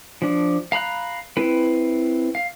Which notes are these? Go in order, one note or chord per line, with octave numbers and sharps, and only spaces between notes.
F3 D4
F5 A#5 B5 F#6
C4 E4 B4
F5